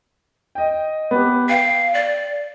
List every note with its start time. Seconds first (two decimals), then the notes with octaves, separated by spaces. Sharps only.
0.55 D#5 G5
1.11 B3 G4
1.49 F5 G5
1.94 D5